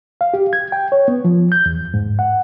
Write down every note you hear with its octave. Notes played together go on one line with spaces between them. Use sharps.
F5
G4
G#6
G5
C#5
B3
F3
G6
E2
G#2
F#5